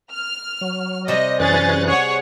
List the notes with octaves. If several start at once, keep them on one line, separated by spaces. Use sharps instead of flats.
F6
F#3
C3 G3 D#5
F#2 E3 C#4 G#4 F#6 A6
G#4 C#5 F#5